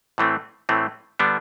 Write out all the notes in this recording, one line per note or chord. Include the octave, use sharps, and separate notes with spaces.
A2 E3 A3 C4
A2 E3 A3 C4
D3 G3 B3 D4